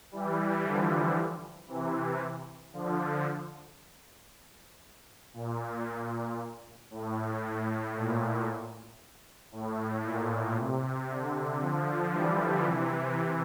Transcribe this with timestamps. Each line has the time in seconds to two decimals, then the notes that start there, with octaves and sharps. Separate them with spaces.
0.12 E3 G3
0.64 D3 F3
1.68 C3 E3
2.73 D3 F3
5.34 A#2
6.91 A2
7.43 A2
7.95 A#2
9.52 A2
10.04 A#2
10.55 C3
11.08 D3
11.60 D3 F3
12.12 E3 G3
12.64 C3 E3